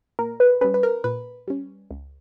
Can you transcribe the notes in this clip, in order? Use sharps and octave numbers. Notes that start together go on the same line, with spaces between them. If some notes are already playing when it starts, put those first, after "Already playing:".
A#2 A#4
B4
G3 C#4 B4
B4
A#4
A#2 B4
G3 C#4
C#2